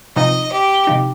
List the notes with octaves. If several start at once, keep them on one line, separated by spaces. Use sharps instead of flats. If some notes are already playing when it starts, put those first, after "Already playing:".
C3 F3 D#4 D#5
G4
C3 F3 D#4